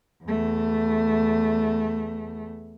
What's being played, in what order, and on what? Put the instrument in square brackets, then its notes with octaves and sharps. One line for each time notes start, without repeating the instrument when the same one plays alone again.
[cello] E2 A3